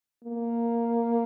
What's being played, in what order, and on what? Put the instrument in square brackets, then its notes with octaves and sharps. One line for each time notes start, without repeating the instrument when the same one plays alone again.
[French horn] A#3